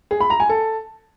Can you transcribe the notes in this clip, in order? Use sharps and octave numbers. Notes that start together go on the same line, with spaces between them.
G#4
B5
A#5
G#5
A4